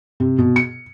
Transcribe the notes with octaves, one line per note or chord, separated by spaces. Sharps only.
C3
B2
C#7